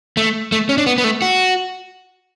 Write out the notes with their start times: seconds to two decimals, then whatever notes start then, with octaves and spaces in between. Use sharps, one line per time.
0.17 A3
0.52 A3
0.69 C#4
0.78 D4
0.86 B3
0.98 B3
1.04 A3
1.22 F#4